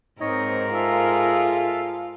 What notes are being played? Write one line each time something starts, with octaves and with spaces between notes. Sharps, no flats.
G#2 C4 D#4 A#4 C#5 D#5
F4 G#4 A4 E5 F5